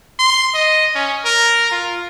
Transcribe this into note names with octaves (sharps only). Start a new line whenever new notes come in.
C6
D#5
C#4
A#4
F4